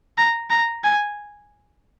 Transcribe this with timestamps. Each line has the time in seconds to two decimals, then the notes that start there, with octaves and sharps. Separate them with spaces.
0.18 A#5
0.50 A#5
0.84 G#5